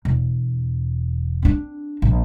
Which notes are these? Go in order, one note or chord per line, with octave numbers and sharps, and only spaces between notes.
E1
C4 D4
A#1